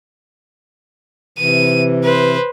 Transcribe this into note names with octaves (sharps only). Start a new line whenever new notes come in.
C3 E3 D#7
B4 C5